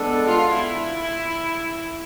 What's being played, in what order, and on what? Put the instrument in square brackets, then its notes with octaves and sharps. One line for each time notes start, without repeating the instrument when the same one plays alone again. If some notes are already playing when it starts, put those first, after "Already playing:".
Already playing: [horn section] G#3 B3 D4 A4
[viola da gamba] F4
E4